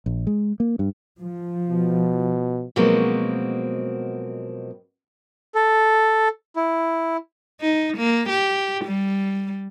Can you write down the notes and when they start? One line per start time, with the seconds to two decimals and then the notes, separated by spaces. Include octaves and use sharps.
0.06 A#1
0.27 G#3
0.60 A#3
0.79 G2
1.20 F3
1.68 B2
2.76 B2 F3 F#3 G#3 A#3 C4
5.55 A4
6.56 E4
7.61 D#4
7.97 A#3
8.29 G4
8.85 G3